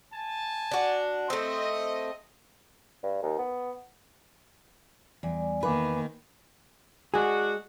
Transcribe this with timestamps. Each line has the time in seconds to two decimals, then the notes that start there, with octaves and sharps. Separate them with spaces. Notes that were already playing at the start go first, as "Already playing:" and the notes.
0.13 G#5 A5
0.71 D4 F#4
1.30 A3 C4 D#5
3.04 G2
3.23 D#2
3.39 B3
5.23 E2 G3 D5 G#5
5.63 D#3 A#3 B4 F5 G#5 D6
7.14 F#3 G#3 D4 F#4 G#4